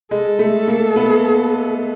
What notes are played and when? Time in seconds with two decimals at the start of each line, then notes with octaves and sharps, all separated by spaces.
0.11 G#3 A4
0.39 A3
0.68 A#3
0.96 B3